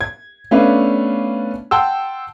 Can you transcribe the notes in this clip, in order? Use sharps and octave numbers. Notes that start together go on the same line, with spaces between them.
G#6
A3 B3 C#4 D4 B4 F5
F#5 G5 A5 C6 E6